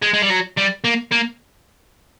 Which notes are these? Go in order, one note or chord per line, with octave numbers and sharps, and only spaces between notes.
G#3
G#3
G3
F#3
G3
A#3
A#3